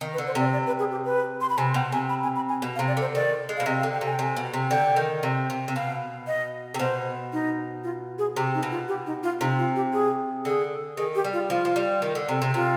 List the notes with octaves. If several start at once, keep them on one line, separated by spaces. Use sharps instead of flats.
D#3
B4
D3
C5
C3 D5
D5
B4
G#4
G4
B4
C6
B5
C3 G#5
B2 G5
C3 G#5
B5
G#5
B5
G#5
B2
F5
C3
D5
D3 C5
D#3 D5
G#3
B2 F5
C3 D#5
F5
D3
G5
C3
G#5
G5
C3 G#5
B2
C3
D3 G5
D#3
C3
C3
C3
B2 F5
D#5
C3
B2 C5
D#4
F4
G#4
C3 G4
D#4
B2
F4
G4
D#4
F4
C3 D#4
F4
G4
G#4
D3 G#4
D#3 G#4
G4
G3
F4
F3 F4
F3
G3
D#3
D3
C3
C3
C3 F4